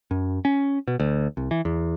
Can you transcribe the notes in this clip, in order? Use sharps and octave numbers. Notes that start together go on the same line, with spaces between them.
F#2
C#4
B2
D2
C2
E3
E2